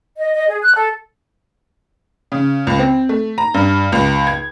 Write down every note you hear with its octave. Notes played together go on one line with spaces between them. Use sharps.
D#5
D#5
G#4
F#6
A4
C#3
C#2
C4
A3
A#5
G2
C#2
G#6